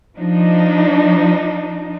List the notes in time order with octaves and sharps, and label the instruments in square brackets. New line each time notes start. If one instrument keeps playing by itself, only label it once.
[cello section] F3 D4 D#4